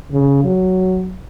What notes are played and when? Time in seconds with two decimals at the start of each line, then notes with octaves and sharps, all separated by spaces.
0.12 C#3
0.44 F#3